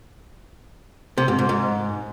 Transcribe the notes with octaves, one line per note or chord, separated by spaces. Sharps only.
C3
G#2
G#2
G#2